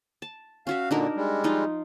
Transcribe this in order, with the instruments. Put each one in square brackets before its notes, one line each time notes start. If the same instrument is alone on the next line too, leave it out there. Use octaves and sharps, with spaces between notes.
[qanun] A5
[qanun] C#4 F#4 E5 [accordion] F5
[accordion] A#2 D3 [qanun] D4 D#4 A#4
[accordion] G3 G#3
[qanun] F3 D#4 F4